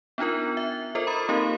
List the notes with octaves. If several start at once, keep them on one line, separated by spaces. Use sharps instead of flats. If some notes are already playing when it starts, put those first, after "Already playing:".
B3 D4 D#4 F4 A#4
E5
F4 A4 A#4 C5 D#5
A#5 B5 D#6 A6
A#3 C4 D#4 G4 A#4